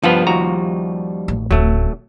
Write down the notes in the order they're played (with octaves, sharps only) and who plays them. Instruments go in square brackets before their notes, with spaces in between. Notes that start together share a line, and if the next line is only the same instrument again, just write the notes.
[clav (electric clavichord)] G2 B3 [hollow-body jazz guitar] F3 G3 F4
[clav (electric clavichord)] D#2 F#4 A#5
[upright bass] A1
[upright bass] D1 C#3 [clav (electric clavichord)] F#3 A3